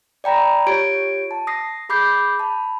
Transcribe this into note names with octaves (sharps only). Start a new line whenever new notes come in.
D5 G5 A#5 B5 A#6
F4 G4 C#5 G#6 D7
A5
D#6 A#6 C7
G#4 B5 D6 G6 C7
A5 B5